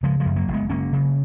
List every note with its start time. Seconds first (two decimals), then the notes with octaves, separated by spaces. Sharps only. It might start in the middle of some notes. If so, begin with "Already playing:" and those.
0.03 C#3 F3 G#3
0.20 F3 G#3
0.26 F#2
0.36 F#3 A#3
0.48 F#1
0.53 G#3 B3
0.70 F#1 A#3 C#4
0.93 C#3